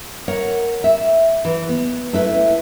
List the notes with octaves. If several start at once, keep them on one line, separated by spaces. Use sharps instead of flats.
A#4 C#5 F#5
E5
E3
B3
A3 E4 B4